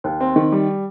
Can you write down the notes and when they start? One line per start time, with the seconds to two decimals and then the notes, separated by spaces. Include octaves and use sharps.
0.04 D#2
0.21 C4
0.36 D#3
0.52 G3